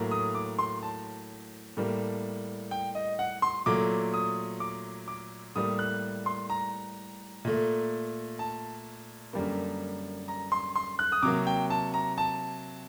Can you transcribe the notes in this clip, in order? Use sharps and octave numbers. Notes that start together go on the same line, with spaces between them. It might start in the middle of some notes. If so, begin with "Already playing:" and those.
Already playing: A2 F#3 A#3
D#6
D6
C6
A5
A2 G3 A#3
G5
D#5
F#5
C6
A#2 F#3 A3 D6
D#6
D6
D6
A2 G3 A#3 D#6
F#6
C6
A#5
A#2 A3
A5
F#2 D3 G3 A#3
A#5
C6
C6
F#6
D#6
C3 F#3 A#3 D6
G5
A5
A#5
A5